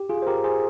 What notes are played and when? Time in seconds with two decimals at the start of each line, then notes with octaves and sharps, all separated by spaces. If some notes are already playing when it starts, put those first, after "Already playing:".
Already playing: G4
0.09 F4 G#4
0.22 C5
0.27 G4 A#4
0.44 G#4 C5